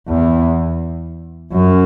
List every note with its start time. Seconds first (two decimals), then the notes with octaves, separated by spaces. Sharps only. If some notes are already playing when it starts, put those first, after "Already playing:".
0.08 E2
1.52 F#2